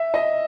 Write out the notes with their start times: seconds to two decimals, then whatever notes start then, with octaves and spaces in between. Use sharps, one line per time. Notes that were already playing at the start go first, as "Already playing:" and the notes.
Already playing: E5
0.14 D#5